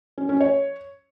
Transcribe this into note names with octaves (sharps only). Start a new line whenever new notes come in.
C#4
C#4
C#5